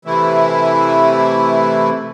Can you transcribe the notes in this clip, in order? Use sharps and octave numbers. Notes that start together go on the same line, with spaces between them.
C3 E3 A3 E4